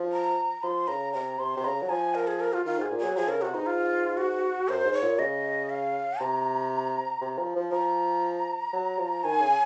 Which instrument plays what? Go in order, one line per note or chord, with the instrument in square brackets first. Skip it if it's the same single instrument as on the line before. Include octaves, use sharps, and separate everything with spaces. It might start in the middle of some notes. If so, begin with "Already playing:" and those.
Already playing: [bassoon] F3
[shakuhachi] A#5
[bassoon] F3 [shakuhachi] C6
[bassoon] C#3 [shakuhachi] A#5
[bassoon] C3 [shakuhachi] A#5
[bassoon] C3 [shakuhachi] C6
[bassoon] C3
[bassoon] C#3 [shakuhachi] A#5
[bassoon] F#3
[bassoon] F3 [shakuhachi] G#5
[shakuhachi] A#4
G#4
A#4
F4
[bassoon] D#3 [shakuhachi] F4
[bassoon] G#2 [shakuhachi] G#4
[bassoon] A#2
[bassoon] F#3 [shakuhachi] G#4
[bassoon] F3 [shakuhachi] G#4
[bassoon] C#3 [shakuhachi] A#4
[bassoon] C3 [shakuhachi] F#4
[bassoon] G#2 [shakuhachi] D#4
[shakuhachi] F4
F#4
[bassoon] F#2 [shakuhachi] C5
[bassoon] G#2
[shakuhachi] C#5
[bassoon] A#2
[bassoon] C#3 [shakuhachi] D#5
[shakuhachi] F5
[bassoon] C3 [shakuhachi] A#5
[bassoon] C3
F3
F3
[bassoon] F3 [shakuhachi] A#5
[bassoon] F#3
F3
[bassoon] D#3 [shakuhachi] G#5
[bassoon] C#3